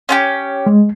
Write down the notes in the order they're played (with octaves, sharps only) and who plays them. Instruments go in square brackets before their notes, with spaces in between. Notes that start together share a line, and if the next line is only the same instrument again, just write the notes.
[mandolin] C#4 F4 G4
[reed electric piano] G#3